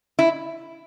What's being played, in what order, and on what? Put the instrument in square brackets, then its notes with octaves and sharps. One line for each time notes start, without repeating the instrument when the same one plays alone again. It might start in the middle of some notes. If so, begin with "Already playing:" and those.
[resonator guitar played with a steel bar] E4